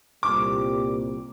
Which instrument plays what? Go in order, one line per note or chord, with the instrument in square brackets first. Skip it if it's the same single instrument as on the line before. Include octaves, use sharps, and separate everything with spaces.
[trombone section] C2 A#2 G3 C4 G4 [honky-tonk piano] D6